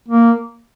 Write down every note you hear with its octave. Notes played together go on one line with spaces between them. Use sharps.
A#3